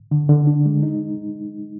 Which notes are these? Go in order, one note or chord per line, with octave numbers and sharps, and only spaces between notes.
D3
D3
D4
G#3
D#4